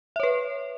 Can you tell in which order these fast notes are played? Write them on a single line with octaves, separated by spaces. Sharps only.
E5 C#5 B4